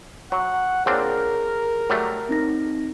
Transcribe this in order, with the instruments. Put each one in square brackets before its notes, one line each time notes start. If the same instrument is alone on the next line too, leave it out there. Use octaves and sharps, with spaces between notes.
[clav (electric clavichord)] F#3 [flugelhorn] F#5 [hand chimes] C#6
[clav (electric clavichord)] A#2 C4 D4 [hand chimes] G#4 C#5 F6 [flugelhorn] A#4
[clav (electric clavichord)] F#3 G3 A3
[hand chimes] C4 D#4 A#6